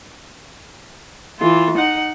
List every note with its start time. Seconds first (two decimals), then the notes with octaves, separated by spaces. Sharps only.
1.40 E3 F4
1.78 D#4 F#5